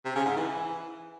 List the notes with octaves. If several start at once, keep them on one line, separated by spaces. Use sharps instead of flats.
C3
C#3
G#2
E3